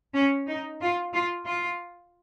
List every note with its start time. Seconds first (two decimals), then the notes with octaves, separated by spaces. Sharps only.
0.14 C#4
0.47 D#4
0.81 F4
1.13 F4
1.46 F4